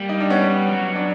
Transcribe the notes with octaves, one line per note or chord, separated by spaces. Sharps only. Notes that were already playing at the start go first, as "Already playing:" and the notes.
Already playing: G3 A#3
D#4
D4
B3 C#4
F#3
D4